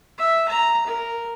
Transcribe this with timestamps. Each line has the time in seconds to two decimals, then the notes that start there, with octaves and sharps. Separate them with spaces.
0.18 E5
0.49 A#5
0.87 A#4